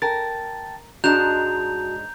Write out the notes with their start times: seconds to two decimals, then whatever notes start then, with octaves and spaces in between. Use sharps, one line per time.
0.02 A#4 G5 A5 A6
1.04 G#2 G#3 D4 F#4 A5 A#5 G6 F7